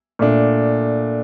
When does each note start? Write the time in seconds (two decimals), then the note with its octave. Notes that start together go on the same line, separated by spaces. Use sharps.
0.19 A#2 A3 D4